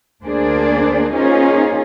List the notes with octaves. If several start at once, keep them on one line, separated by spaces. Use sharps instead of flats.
D2 A#3 D4 G#4 C5 D5
A#3 C#4 D#4 F4 G#4 C5